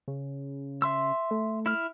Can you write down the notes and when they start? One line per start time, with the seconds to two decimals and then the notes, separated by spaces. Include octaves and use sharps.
0.08 C#3
0.82 E5 C6 E6
1.31 A3
1.66 E4 F6